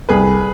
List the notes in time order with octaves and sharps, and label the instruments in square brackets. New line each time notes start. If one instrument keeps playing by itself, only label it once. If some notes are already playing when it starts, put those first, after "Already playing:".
[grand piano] C2 [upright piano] G#4 B4